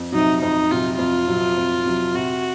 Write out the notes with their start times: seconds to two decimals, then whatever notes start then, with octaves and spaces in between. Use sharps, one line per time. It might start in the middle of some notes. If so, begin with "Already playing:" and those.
Already playing: F2
0.12 C3 F#3 D#4
0.42 F2 D#4
0.71 C3 F#3 F4
0.99 F2 F4
1.28 C3 F#3
1.57 F2
1.85 C3 F#3
2.14 C3 F#4